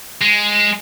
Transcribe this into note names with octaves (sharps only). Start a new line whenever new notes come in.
G#3